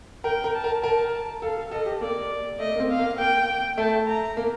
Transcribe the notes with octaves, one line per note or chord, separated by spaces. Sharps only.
A#4 G5
A#4
A5
A#4
A#4 A5
A4 F5
A4
A4 D#5
G4
A#3 D5
A3 D#5
A#3
C4
F5
A#3
A#3 G5
A3 A5
A#5
A#3